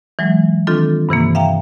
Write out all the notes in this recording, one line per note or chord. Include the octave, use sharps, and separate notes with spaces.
E3 F#3 G#3
D#3 C4 D4 F4 A4
G2 C3 E3 A#3
E5 F5 G5 A#5